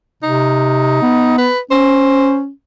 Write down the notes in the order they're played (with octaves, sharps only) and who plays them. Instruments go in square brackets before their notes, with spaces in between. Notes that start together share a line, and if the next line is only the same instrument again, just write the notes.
[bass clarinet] C3 [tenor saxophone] D#4
[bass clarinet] B3
[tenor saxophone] B4
[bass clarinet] C#4 [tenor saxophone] C5